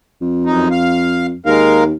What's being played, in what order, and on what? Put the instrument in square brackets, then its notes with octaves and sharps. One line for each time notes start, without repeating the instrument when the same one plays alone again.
[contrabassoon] F2
[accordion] F#2 D#4
F5
[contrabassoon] D#2 [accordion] G#3 A#4 F5